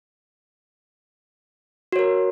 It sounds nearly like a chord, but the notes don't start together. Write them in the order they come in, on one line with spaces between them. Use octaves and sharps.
F#4 C#5 A#4